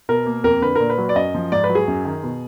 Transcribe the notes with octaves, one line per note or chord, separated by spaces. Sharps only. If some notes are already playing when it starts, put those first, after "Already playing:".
B2 A#4
A#3
F2 A#4
D3 B4
A#2 A#4
B4
F#3
D5
F#2 D#5
F3
G#2 D5
B4
F#3
G#4
F#2
D#3
B2